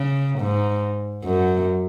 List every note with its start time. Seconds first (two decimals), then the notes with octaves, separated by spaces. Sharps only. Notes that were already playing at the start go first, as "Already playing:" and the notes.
Already playing: C#3
0.39 G#2
1.24 F#2